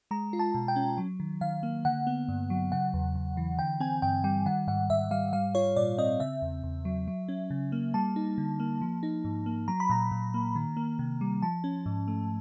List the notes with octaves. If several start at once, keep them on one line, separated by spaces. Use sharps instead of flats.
G#3 A#5
F4
A5
B2
G5
C#4
F#3
D#3
D#3 F5
A#3
D3 F#5
B3
G2
F#3
C#3 F#5
E2
E2
E3
D3 G5
C4 G#5
G2 G5
G3 G5
D#3 F#5
G#2 F#5
G#2 E5
G3 F5
G3 F5
F4 C#5
A#2 D5
C4 D#5
C#3 E5
E2
E2
F#3
F#3
C#4
C#3
A#3
G3 A5
D#4
D3
A#3
F3
D#4
G#2
A#3
F#3 A#5
B5
A#2 A#5
A#2
A#3
D#3
A#3
C3
G3
F3 A5
C#4
G#2
A3